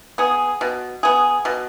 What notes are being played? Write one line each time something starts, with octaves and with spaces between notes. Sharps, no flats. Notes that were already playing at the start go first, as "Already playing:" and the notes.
B3 G#4
B2
B3 G#4
B2